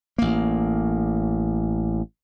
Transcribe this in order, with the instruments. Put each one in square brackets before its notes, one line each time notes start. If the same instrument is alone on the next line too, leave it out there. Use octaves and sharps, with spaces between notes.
[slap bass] A1 A#3